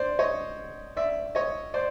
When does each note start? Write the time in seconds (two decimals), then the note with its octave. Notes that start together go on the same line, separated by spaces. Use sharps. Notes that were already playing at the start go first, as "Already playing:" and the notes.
Already playing: C5 D5
0.19 C#5 D#5
0.97 D5 E5
1.35 C#5 D#5
1.74 C5 D5